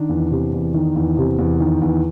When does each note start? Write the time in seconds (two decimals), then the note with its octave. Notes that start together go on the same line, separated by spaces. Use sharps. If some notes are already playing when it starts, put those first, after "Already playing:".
Already playing: D#3 D4
0.09 E2
0.30 C3
0.53 E2
0.74 D#3
0.96 E2
1.17 C3
1.38 E2
1.60 D#3
1.81 E2